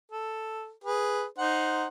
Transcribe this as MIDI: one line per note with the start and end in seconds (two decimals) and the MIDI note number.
0.12 0.71 69
0.84 1.25 68
0.84 1.25 71
1.38 1.86 63
1.38 1.86 72
1.38 1.86 78